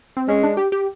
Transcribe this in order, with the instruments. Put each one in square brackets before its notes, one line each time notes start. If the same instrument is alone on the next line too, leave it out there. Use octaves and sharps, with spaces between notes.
[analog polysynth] C4
[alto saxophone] G#3 [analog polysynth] C#4
[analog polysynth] D4
G4
G4